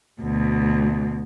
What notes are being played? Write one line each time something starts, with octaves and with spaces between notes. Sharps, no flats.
D2 B2